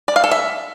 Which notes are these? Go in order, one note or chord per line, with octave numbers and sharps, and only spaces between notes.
D5
F5
A4
E5